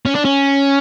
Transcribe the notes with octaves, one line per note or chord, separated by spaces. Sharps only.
C#4
D4
C#4